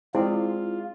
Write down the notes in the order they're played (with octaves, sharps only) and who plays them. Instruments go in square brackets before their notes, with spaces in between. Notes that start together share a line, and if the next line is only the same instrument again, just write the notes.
[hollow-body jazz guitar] G#3 D5 [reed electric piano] C4 [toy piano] E4 [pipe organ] F4